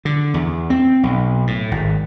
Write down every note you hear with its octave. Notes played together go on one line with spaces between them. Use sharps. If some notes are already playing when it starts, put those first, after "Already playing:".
D3
E2
C4
B1
A2
G#1